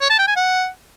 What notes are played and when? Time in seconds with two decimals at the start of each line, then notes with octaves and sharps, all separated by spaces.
0.01 C#5
0.10 A5
0.18 G5
0.27 G#5
0.36 F#5